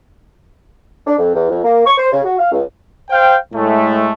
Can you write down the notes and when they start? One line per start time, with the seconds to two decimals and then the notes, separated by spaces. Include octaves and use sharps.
1.07 D4
1.19 F2
1.35 E2
1.50 F2
1.64 A#3
1.86 C#6
1.98 C5
2.12 C#3
2.25 F#4
2.39 F5
2.52 C#2
3.10 C5 F5 G5
3.54 A2 G#3 A3